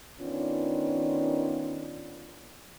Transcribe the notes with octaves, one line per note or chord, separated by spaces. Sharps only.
D#3 B3 C#4 D4 F4